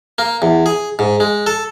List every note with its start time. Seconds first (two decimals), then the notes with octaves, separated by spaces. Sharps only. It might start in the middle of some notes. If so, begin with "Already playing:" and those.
0.18 A#3
0.42 E2
0.66 G#4
0.99 G#2
1.20 G#3
1.47 A4